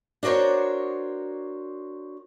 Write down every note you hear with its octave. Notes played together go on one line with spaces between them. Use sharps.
D4 F#4 A#4 C5 C#5